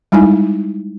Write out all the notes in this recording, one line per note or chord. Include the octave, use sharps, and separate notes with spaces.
G3 G#3 D#4 E4 G#5